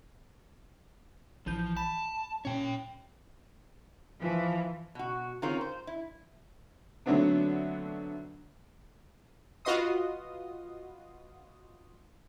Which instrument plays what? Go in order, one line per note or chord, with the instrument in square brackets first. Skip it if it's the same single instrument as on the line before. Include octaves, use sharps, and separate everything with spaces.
[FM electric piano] A1 E3 G6 [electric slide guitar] F3
[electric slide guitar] A5 [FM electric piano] B5
[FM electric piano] A#2 C#4 [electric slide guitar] C#5 G5
[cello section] E3 [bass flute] F3
[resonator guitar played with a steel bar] B2 F#4
D#3 C4 C#4 F4 G#4 A#4
C5
E4
[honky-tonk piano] D3 F#3 A3 B3 C4 D4
[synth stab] F4 F#4 B4 D#5 C6 D#6